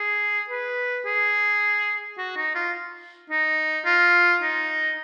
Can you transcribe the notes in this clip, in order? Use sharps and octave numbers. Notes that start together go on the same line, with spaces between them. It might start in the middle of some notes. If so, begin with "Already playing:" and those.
Already playing: G#4
B4
G#4
F#4
D#4
F4
D#4
F4
D#4